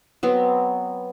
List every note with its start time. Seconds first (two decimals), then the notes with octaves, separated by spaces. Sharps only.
0.23 F#3 B3 C4